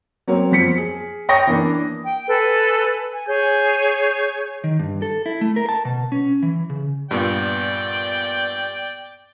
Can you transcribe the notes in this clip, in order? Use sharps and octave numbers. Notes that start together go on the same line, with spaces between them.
F#3 A#3 C4 C#5
F2 F3 B6 C#7
G#4
C#5 G5 C#6 D#6 A#6
E3 A#3 D4
G5
A4 B4 G#5
G#5
G#4 C#5 G6
D#3
G2
A4
E4
A3
A#4
A5
B2
C#4
E3
C#3
G2 A#2 B3 D5 G5